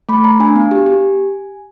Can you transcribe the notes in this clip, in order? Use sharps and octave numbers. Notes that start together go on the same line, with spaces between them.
A3 B5
A3 A#5
D4 G#5
B3
G4
G4